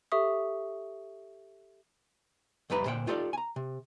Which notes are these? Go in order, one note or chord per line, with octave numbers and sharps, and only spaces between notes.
G4 A4 E5 C#6 D#6
C2 F2 G3 B4 A5 A#5
D2 A#2 C5 F#5 G5
D#4 F4 G4 A4 B4 D5
G#5 A#5
C3